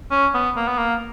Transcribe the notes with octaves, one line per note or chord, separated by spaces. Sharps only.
C#4
B3
A#3
B3
A#3